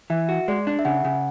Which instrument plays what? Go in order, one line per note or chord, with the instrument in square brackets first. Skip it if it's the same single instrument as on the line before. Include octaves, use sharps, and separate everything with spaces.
[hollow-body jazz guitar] E3 [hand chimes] E5
[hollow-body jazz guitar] F#4
[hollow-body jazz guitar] G#3 [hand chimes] D5
[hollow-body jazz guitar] D4
[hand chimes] E5
[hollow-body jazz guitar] C#3 [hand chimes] F#5
[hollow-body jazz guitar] C#3